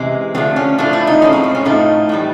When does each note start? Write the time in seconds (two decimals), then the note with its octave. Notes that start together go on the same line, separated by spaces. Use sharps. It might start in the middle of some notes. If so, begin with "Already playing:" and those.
Already playing: C3 E3 G#3 C#4
0.34 D3 F3 A3 C4
0.56 C#4
0.78 A2 F3 A3 D4
0.93 E4
1.07 D#4
1.22 A2 F3 G#3 C#4
1.33 C4
1.44 C4
1.55 C#4
1.65 A2 F3 A3 D#4
2.09 A2 E3 G3